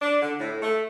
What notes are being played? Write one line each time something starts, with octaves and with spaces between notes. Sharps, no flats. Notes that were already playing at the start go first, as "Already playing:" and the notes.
D4
D3
A2
A3